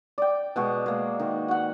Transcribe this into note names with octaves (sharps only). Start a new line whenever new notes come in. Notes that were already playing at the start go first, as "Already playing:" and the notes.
D5 G5
B2 G#3 F#4
G#3 A#3
D#3
F#4 F#5